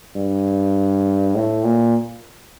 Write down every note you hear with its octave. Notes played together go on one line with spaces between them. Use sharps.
G2
A2
A#2